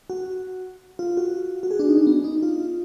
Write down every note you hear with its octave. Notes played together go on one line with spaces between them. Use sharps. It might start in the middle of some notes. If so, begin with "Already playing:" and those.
F#4
F4
F#4
F#4
G#4
D4
D#4
D4
B3
D#4
F4